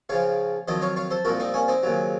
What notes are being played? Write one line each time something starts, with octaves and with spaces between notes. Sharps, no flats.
C#2 C#3 F3 C#5 F5
F2 D#3 F#3 C5 D#5
C#5 F5
C#5 F5
A4 C5
C2 A#2 F3 F#4 A#4
C4 D#4
A#3 C#4
C4 D#4
D#2 C#3 F#3